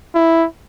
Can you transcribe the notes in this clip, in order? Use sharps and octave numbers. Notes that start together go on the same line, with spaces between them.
E4